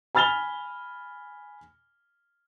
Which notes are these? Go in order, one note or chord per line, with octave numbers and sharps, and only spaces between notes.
G#5 B5 F6 A6 F7 G7